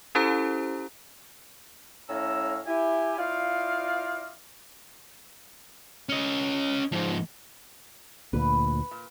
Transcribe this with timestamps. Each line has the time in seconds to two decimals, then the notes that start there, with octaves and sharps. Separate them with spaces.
0.15 C#4 E4 G4 A4 C5 A#5
2.09 A2 C#4 A4 F5 A#5 E6
2.66 E4 G4 G#5
3.17 E4 F4 C5 D5 D#5 F5
6.09 C#4 D#5
6.92 G#2 F3
8.33 D2 A#2 B4
8.91 A#2